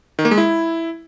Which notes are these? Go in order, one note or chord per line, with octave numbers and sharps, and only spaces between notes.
D#3
A#3
G#3
E4